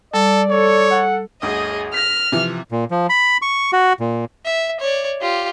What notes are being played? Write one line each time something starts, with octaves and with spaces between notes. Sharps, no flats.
G3 A4 D5
A4 C#5
F#5
G1 D2 G#4 D#5 D#6
F6 A#6 B6
C3 E3 F3
A#2
F3
B5
C#6
F#4
A#2
E5
C#5 D5
F4 G4